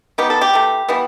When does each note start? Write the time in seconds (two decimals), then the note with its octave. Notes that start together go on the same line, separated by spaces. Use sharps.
0.18 D#3 G3 B3 G4
0.30 A4
0.41 G4
0.53 E3 A3
0.89 E3 G3 B3